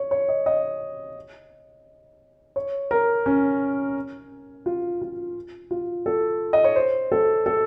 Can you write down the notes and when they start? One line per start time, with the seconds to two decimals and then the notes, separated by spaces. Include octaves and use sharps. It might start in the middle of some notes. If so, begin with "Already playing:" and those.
Already playing: C#5
0.11 C#5
0.29 D#5
0.46 D#5
2.56 C#5
2.91 A#4
3.26 C#4
4.66 F4
5.02 F4
5.71 F4
6.06 A4
6.53 D#5
6.64 C#5
6.76 C5
7.12 A4
7.46 A4